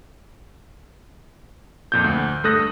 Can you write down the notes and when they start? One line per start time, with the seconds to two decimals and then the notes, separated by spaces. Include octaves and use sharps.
1.92 F2 A#2 G6
2.04 D2
2.44 G2 A3 A4 D#6 F#6 A#6